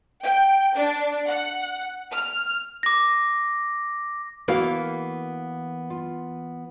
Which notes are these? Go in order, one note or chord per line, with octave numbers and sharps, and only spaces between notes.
G5
D4
F#5
F6
D6 A#6
E3 A#3 B3 F#4 F5
F4